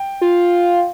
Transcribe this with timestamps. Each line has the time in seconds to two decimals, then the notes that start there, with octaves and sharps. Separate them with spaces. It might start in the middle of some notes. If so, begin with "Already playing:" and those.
Already playing: G5
0.21 F4